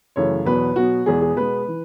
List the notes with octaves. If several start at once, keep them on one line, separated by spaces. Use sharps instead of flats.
F#2 C#3 E3 A3 C#5
E2 B2 F#3 B4
B2 F#3 B3 F#4
E2 B2 G#3 B3 G#4
G#4
B2 G#3 B3 B4
E3